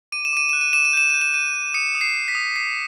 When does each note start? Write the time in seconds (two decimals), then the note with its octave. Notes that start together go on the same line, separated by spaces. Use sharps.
0.12 D6 D#7
0.25 E7
0.33 D6 D#7
0.49 F#6 E7
0.61 D#7
0.73 D6 E7
0.85 D#7
0.93 G6 E7
1.10 G6 D#7
1.21 E7
1.34 G6 D#7
1.54 G6
1.74 D#6 C#7
1.95 D#6
2.01 C7
2.15 D#6
2.28 B6
2.35 D#6
2.56 D6 C7